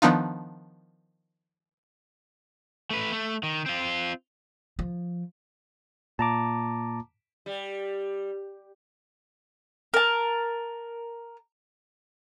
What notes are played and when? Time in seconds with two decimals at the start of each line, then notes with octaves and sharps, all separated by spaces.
0.02 D#3 F3 B3 D4 D#4 F4
2.91 A3 B4
3.12 A3
3.43 D#3
3.66 C4 F4
4.79 F3
6.19 A#2 A5 A#5 D6
7.46 G3
9.94 A#4 A5